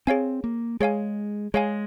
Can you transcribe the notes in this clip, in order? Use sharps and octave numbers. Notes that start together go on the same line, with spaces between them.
C4 G#4 C#5 F5 G#5
A#3
G#3 G#4 C#5 F5 G#5
G#3 G#4 C#5 F5 G#5